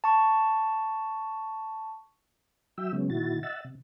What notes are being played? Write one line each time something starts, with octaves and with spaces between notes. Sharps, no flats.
A5 C#6
F#3 F#4 E5 G5 E6
C#3 F#3 G#3 B3 C#4
A#2 D#3 E4 F#4 A6
D#5 E5 F#5 E6 A6
C3